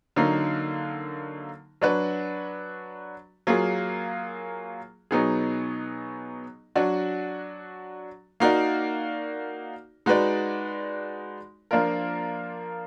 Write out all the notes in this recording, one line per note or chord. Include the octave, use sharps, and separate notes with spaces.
D3 F#3 A#3 D#4
F#3 D4 F#4 B4
F#3 A#3 F4 G#4
B2 F#3 B3 D#4 G#4
F#3 D4 F#4
A#3 D#4 F#4 D5
G#3 D#4 F#4 B4 D5
F3 A#3 D4 F4 A#4